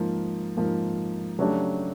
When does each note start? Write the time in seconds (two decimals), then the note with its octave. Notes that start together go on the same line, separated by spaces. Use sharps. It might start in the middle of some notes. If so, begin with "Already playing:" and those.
Already playing: G#2 F3 A#3
0.57 G#2 F3 A#3
1.39 C#3 F#3 A3 D4 G4